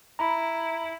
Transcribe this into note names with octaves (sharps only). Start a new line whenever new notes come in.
E4 A#5 B5